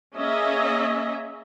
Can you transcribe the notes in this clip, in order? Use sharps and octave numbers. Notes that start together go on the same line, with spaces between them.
A#3 C#4 G#4 D#5 E5